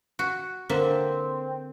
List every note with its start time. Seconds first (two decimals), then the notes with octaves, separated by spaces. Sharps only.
0.19 F#4
0.69 D3 A#3 C4 E5